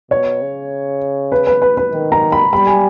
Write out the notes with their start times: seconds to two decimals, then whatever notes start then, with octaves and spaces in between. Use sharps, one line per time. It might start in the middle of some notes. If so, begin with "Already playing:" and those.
0.11 B2 C#5
0.42 C#3
1.32 B4
1.47 B4
1.62 B4
1.77 B4
1.92 D#3
2.12 A#5
2.32 B5
2.52 G3 B5
2.67 G#5